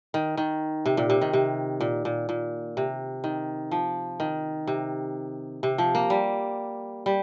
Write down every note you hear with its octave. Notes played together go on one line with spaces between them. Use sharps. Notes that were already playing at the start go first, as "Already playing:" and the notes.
D#3
D#3
C3
A#2
C3
D#3
C3
A#2
A#2
A#2
C3
D#3
F3
D#3
C3
C3
F3
A#3
G3
G3